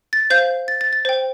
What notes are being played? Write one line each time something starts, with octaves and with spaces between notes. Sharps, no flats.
A6
C5 F5 G6
A6
A6
A6
C5 G5